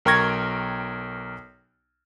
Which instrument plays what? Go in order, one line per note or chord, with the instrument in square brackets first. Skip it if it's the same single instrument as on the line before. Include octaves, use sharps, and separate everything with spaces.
[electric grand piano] B1 A#4 G5 C#6 G#6 A#6